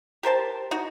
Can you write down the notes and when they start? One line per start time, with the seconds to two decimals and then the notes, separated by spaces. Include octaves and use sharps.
0.23 G4 A#4 C5 A5
0.71 D#4 F#4